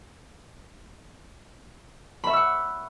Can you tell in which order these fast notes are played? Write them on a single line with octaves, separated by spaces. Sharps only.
B5 E5 C#6 E6 F#5